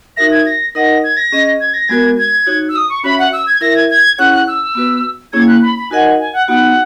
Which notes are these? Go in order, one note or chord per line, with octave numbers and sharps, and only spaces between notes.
D#4 F#4 A#4 E5 A#6
G#6
A#6
D#4 A#4 D#5 F#5 A#6
G#6
A#6
C#4 G#4 D#5
G#6
A#6
G#3 B3 F#4 A#4 G#6
G#6
D#4 F#4 C#5
E6
D#6
C#6
C#4 F#4 C#5 E5 B5
F#5
E6
G#6
E4 A#4 E5 A#6
G#6
G#6
C#4 E4 G#4 C#5 F#5 F#6
F#6
E6
B3 F#4 B4
A#3 C#4 E4 G#4 C#5 G#6
F#6
B5
B5
D#4 F#4 A#4 D#5 F#5 G#5
G#5
F#5
B3 D#4 F#4 F#5